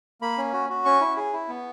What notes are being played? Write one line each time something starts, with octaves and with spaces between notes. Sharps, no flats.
A#3 B5
C#4
F#4
F#4
C#4 C#6
E4
G#4
E4
B3